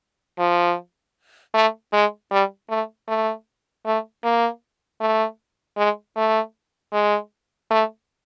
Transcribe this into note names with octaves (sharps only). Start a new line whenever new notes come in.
F3
A3
G#3
G3
A3
A3
A3
A#3
A3
G#3
A3
G#3
A3